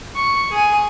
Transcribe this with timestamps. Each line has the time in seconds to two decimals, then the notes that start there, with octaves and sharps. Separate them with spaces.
0.15 C#6
0.50 G#4 G#5